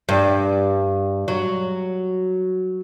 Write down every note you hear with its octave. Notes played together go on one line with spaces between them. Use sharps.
G2
F#3